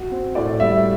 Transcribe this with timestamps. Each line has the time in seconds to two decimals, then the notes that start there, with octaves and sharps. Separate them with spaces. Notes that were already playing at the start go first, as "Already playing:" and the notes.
Already playing: F#4
0.11 C4
0.35 A2 D5
0.60 G3 E5